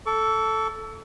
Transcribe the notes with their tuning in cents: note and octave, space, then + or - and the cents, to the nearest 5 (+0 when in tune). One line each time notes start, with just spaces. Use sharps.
A4 +0 C#6 +45